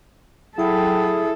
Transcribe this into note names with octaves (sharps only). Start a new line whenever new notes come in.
F#3 E4 G#4 A4 G5 A5